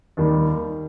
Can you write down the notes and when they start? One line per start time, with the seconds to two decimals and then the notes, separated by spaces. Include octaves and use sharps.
0.17 D#2 D#3 G3